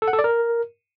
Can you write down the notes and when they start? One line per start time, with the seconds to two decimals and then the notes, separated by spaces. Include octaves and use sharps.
0.02 A4
0.08 F#5
0.13 A4
0.19 D5
0.24 A#4